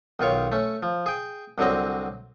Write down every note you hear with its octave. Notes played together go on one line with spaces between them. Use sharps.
B1 D#3 F4 C#5
A3 C#4
F3
G#4 G5
C2 D3 F#3 C4 D#5